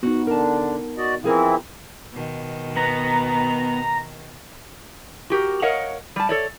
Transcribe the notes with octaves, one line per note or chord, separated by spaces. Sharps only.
B3 D#4 F#4
D3 D4 A#4 A5
F#4 D5 D#5
E3 F3 C4 E4 G#4 A#4
B2 D#3
B3 A#5
F#4 G4 A#4
A#4 C#5 D#5 F5 F#5
G3 A5
A4 C#5 D5